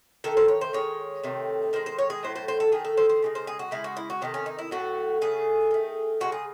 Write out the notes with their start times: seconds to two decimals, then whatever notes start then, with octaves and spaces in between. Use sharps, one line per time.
0.24 D#3 A3 A4
0.37 C5
0.48 C#5
0.61 C5
0.73 D#3 G#3 C#5
1.24 C3 D#3 A3
1.73 D#3 G#3 C5
1.86 C5
1.99 C#5
2.10 G#4
2.23 A2 F#3 A3 C5
2.36 C5
2.48 C5
2.60 A4
2.72 D#3 A3 G#4
2.85 A4
2.97 C5
3.09 C5
3.22 C#3 E3 G#3
3.35 C5
3.47 G#4
3.59 F#4
3.71 C#3 G#3 E4
3.84 F#4
3.97 E4
4.10 F#4
4.21 C3 D#3 A3 C4
4.34 C#4
4.46 D#4
4.59 E4
4.71 A2 F#3 A3 F#4
5.21 C#3 F#3 A3 G#4
5.71 D#3 A3
6.21 C#3 E3 F#4
6.24 G#3
6.32 G#4